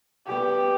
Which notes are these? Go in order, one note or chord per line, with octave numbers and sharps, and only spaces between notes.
E3 G3 B3 G4